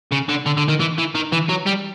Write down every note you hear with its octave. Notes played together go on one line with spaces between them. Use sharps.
C#3
D3
D3
D3
D#3
E3
E3
D#3
E3
F#3
G3